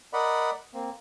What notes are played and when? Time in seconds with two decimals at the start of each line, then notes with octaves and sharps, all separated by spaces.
0.13 A#4 D5 D#5 F#5 B5
0.74 A#3 C4